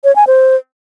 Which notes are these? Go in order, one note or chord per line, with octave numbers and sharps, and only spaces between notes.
C#5
G#5
C5